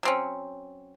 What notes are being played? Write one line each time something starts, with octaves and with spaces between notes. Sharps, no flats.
F#3 C4 C#4